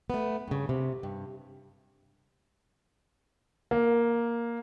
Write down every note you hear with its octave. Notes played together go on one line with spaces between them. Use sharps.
A3 B3
G2 C#3
C3
G2
A#3